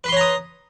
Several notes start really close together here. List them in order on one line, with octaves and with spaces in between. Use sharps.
B4 C6 C#5 A#5 D#6